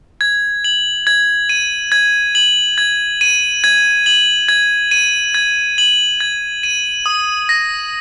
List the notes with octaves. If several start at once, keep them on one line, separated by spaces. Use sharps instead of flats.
G#6
F#7
G#6
D#7
G#6
F#7
G#6
D#7
G#6
F#7
G#6
D#7
G#6
F#7
G#6
D#7
D#6
A#6